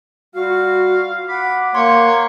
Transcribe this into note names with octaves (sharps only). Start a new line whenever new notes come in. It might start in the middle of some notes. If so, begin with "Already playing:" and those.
G3 F4 F#4 F5
F#5 B5 D6
A#3 C#5 C6